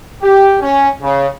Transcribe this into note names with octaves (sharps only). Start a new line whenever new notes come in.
G4
C#4
C#3